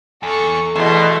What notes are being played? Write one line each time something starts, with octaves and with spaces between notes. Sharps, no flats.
E2 A4 C#6
E2 B2 A3 A4 C6